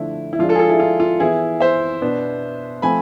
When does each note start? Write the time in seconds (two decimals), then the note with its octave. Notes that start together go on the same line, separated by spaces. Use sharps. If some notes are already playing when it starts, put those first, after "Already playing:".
Already playing: D3 F3 A3 D4 E4
0.33 E4
0.39 F3 G#3 D4 F4
0.49 F4 A4
0.55 G#4
0.59 F4 A4
0.70 E4 G#4
0.80 F4
1.00 F4
1.20 E3 B3 E4 G#4
1.60 C5 E5
2.02 B2 B3 D4
2.82 F3 A3 C4 G#5 B5